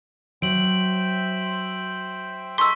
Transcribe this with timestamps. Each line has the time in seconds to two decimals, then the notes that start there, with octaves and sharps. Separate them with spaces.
0.42 F#3 C5 E5 G5 D7 F#7
2.58 D#4 G#4 A4 C6 C#6 E6 B6